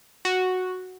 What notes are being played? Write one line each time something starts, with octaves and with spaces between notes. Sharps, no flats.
F#4